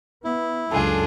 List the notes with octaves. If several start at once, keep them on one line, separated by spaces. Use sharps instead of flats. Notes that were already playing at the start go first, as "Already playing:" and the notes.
B3 E4
C#2 F#2 D4 F4 G#4 A4 G#5